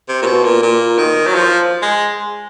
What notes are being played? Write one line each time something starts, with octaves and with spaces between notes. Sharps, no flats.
C3
A#2
B2
A#2
A#2
D#3
F#3
F3
G#3